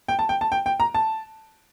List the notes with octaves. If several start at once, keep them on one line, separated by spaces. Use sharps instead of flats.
G5
A5
G5
A5
G5
G5
A#5
A5